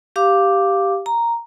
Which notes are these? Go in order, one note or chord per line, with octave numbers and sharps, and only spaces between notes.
G4 F5 D6
A#5